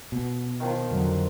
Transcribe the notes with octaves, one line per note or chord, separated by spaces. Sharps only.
B2
D#3 F3
F2 D3 F#3